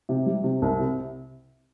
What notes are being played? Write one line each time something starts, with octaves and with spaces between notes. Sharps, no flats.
C3
G3
C3
C2
C3